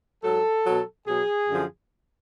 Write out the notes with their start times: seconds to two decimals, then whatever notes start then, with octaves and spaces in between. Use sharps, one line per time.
0.23 G#2 F#3 A4
0.65 B2 F#3
1.07 B2 F#3 G#4
1.49 F#2 D3 F3